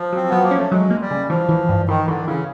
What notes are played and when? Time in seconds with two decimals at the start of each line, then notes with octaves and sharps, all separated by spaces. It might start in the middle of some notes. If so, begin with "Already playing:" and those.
Already playing: F3
0.12 F#3 C4
0.30 F#3 B3
0.43 A#3
0.51 C#4
0.57 A3
0.71 F#3 G#3
0.90 A#3
1.01 G3
1.11 C#3
1.29 E3 F3
1.49 E3
1.69 G2
1.88 D#3 E3
2.08 D3 E3
2.27 C#3 E3